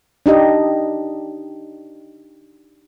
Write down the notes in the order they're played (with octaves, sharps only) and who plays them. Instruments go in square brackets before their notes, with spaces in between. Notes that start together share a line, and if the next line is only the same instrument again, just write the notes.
[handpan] D4 D#4 G4 D#5